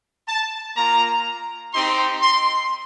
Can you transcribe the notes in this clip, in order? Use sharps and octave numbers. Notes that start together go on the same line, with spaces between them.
A5
A#3 F4 A#5
C4 D#4 G4 C6
C6